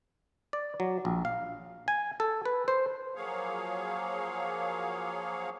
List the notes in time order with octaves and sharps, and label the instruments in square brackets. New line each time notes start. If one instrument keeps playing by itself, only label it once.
[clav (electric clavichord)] D5
F#3
A#1
F5
G#5
A4
B4
C5
[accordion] F3 F#3 A#3 G#4 C#5 F5